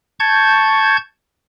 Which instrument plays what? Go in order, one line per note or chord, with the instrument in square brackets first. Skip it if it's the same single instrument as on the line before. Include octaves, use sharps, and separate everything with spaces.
[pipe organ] A5 C#6 G6 G#6